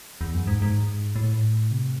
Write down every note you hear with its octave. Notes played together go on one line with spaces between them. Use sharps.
E2
F#2
G#2
G#2
A2
C3